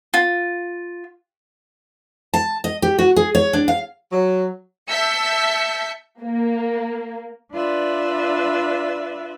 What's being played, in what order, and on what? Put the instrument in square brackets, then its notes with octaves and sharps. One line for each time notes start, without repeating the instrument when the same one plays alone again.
[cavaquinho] F4
[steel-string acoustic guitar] A5
D#5
G4
F#4
G#4
C#5
D4
F5
[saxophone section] F#3
[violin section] E5 A5 E6 G6 B6 C#7
A#3
[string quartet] D4 F4 B4 D5 E5